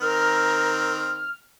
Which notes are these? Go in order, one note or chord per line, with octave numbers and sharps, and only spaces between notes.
D#3 C4 A#4 F6